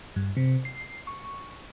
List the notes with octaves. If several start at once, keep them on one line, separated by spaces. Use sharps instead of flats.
G2
C3
C7
C#6